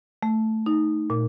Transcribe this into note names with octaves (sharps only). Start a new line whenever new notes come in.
A3
D#4
A#2